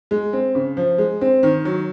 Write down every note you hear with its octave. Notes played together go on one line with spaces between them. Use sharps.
G#3
C4
C#3
F3
G#3
C4
D#3
F#3